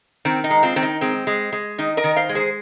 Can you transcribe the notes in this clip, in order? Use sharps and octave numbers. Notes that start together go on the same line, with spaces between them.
D#3 C4
D#4
G#3
C4 F4
D#3 C4
D#4
G#3 C4
G#3
G#3
D#3 D#4
A#4 D#5
D#3
C5 F5
G#3
G#4 C5